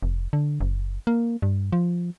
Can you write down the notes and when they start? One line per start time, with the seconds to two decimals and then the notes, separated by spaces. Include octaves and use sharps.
0.02 F1
0.33 D3
0.60 F#1
1.07 A#3
1.42 G2
1.72 F3